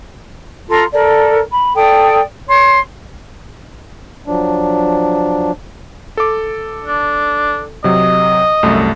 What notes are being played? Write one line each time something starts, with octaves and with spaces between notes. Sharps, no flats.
F4 A4 A#5 C6
A4 A#4 D5
B5
A4 D5 G5 D#6
C#5 C6
F3 F#3 D4
A4 D6
D4
C3 F#3 D#5
C2 F#2 A3